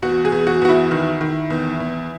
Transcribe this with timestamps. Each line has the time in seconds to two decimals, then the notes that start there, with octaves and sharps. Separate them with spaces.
0.02 E2 F#4
0.25 G#4
0.32 E2
0.47 F#4
0.62 E2 F#4
0.69 E4
0.91 D#3
1.21 D#3
1.50 E2
1.80 E2